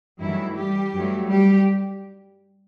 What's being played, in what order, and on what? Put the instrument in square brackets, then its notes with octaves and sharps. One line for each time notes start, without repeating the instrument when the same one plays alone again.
[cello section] G2 D#3 E3 F#3 A3 E4
G3 G4
G2 F#3 A3
G3 G4